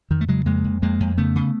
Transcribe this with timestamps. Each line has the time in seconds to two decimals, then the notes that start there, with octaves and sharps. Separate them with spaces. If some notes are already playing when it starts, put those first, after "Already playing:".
0.10 F2 D#3
0.21 A3
0.28 C#3 F#3 G#3
0.46 F2 G#3 A#3
0.64 F2
0.82 F2 G#3 A#3
1.00 F2
1.18 C#3 A3 B3
1.36 C#3